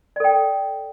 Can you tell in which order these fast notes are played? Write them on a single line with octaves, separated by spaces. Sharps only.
D5 A4 G5